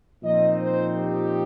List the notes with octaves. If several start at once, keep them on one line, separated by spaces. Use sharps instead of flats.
A#2 F3 C4 D#4 D#5
C5
G4